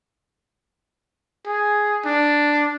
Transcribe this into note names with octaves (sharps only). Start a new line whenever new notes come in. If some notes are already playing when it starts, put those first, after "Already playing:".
G#4
D4